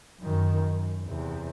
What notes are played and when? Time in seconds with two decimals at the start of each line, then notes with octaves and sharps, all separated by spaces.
0.20 F#2 D#3
0.73 F#2
1.07 E2 C3